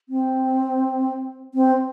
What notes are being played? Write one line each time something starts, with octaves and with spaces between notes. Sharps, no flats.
C4
C4